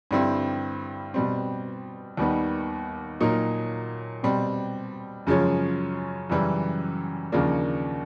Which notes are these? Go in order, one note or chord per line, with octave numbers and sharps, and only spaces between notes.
G2 D3 G3 C4 E4
B2 G3 C4
D#2 D#3 G3 B3
A#2 F#3 A#3 D#4
B2 G3 C4
F#2 C#3 F3 G#3 C#4
F#2 C#3 E3 G3
D#2 C#3 F3 A#3 D4